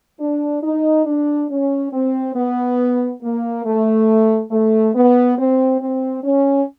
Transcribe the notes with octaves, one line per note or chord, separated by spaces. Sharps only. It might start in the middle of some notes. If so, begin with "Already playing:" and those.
D4
D#4
D4
C#4
C4
B3
A#3
A3
A3
B3
C4
C4
C#4